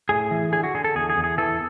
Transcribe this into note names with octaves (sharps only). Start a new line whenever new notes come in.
A2 G#4
E3
D3 G#4
F#4
D3 G#4
A4
E2 G#4
G#4
E2
G#4
E3 A4